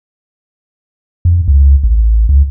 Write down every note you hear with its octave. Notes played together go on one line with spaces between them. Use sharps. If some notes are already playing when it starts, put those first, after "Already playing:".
F2
C#2
A1
C#2